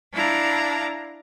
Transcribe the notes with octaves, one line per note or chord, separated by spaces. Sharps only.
D4 E4 F5 A#5